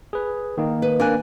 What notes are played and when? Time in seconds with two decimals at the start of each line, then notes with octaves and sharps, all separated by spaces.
0.13 G#4 B4
0.58 D#3 A#3 D#4
0.82 B4
1.00 A#3 D4 G#5 F#6